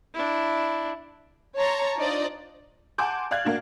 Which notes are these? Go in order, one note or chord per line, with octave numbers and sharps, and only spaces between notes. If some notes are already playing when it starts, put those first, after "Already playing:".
D4 E4
C#5 A5 A#5 C6
D4 D#4 F4 C5 D5 D#5
F#5 G#5 A5 C6 D6 G6
D5 F5 F#6 G#6
A#3 D4 F#4